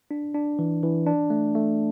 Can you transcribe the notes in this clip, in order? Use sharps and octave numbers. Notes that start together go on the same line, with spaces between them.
D4
D4
E3
E3
D4
A3
A3